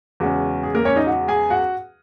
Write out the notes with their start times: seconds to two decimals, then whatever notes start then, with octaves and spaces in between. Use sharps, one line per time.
0.20 E2 C#3 G#3 C#4 F#4
0.63 G#4
0.74 A#3 A#4
0.85 C#4 C#5
0.96 D#4 D#5
1.06 F#4 F#5
1.28 G#4 G#5
1.50 F#4 F#5